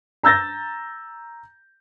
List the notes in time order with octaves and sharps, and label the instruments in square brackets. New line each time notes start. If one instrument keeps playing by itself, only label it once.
[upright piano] A#5 E6 G6 A6 A#6